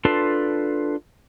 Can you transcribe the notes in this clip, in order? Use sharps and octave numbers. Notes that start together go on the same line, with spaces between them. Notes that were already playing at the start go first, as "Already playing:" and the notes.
D4 F4 A4 B4 C6